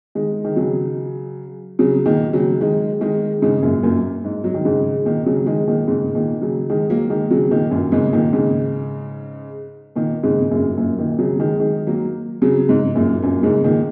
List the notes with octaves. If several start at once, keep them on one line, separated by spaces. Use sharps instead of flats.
D#3 G#3
D#3
C#3 F#3
C#3 F#3
A#2 D#3
C#3 F#3
D#3 G#3
D#3 G#3
G#2 C#3
F#2 A#2
F#2 A#2
G#2
F#3
D#3
G#2 C#3
A#2 D#3
C#3 F#3
D#3 G#3
A#2 D#3
G#2 C#3
A#2 D#3
C#3 F#3
D#3 G#3
F#3 A#3
D#3 G#3
C#3 F#3
A#2 D#3
F#2 A#2
G#2 C#3
A#2 D#3
G#2 C#3
A#2 D#3
G#2 C#3
C#3
F#2 A#2
F#2 A#2
A#2 D#3
C#3 F#3
D#3 G#3
D#3 G#3
F#3 A#3
C#3 F#3
G#2 C#3
F#2 A#2
F#2 A#2
G#2 C#3
A#2 D#3